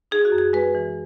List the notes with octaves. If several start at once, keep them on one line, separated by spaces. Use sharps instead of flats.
D#4 G#4
F#4
F#2
G#4
G#3 B4
E3